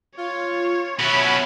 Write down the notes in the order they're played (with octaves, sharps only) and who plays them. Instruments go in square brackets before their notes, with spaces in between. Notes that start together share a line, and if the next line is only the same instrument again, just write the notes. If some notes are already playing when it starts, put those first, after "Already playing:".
[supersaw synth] F4 [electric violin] C#5
[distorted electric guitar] B2 C#4 [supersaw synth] C#5 E5 F#5 [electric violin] B5